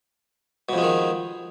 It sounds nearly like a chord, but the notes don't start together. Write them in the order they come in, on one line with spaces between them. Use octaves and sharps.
B2 F2 G#3 D#3